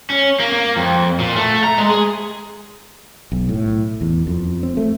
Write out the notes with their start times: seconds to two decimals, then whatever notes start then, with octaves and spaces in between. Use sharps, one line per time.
0.10 C#4
0.40 A#3
0.53 A#3
0.76 F2
1.20 A#2
1.36 A3
1.64 A#5
1.78 G#3
1.89 G#4
3.32 B1
3.49 A2
4.01 E2
4.27 F2
4.63 C4
4.77 A3